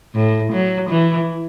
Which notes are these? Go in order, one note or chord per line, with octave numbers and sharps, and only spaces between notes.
A2
F#3
E3